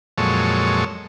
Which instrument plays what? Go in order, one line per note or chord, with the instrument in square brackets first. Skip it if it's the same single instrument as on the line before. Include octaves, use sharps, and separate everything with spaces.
[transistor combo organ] F2 A#2 F#3 G#3 A4 C#5